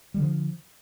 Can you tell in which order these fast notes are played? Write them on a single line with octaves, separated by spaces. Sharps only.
G3 D3 F3